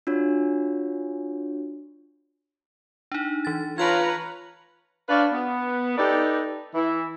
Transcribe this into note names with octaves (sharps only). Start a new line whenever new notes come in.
D4 F4 F#4 C#5
D4 D#4
E3 A6
F4 B4 C#5 A5 A#5 F6 G#6
D4 B4 C#5 F5
B3
D#4 G4 A4 B4 D5
E3 E4